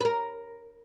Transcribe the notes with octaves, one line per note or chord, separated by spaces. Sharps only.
B4
A#4